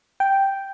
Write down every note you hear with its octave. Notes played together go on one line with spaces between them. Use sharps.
G5